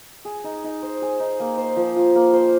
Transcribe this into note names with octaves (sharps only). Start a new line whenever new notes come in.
G#4
D#4
D#4
C5
G#4
D#4
A#3
C5
F3
F4
A#3
C5